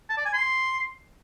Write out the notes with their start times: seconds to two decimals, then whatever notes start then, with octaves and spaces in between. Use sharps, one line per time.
0.09 A5
0.17 D5
0.25 G#5
0.33 C6